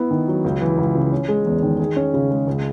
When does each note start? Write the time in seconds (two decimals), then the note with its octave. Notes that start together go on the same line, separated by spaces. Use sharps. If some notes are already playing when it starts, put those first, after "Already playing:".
Already playing: B3 E4
0.11 D#3
0.28 F#3
0.44 C#2
0.61 E3
0.78 C#2
0.95 C#3
1.12 C#4
1.28 G#3
1.46 E2
1.63 D#3
1.80 G#4
1.96 C#4
2.14 C#3
2.31 G#3
2.47 C#2